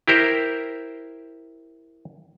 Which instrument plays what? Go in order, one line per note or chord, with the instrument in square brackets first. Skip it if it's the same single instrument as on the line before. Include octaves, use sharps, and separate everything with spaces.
[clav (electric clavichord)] E4 G4 A#4 C5